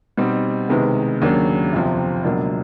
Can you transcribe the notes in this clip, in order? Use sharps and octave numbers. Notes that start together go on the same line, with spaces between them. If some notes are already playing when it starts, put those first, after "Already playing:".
B2 G3 C4 D#4
C2 C3 D#3 G#3 B3
D#2 C#3 F#3 A#3 D4
G1 F2 C3 F3
C#2 B2 F#3 A#3 D4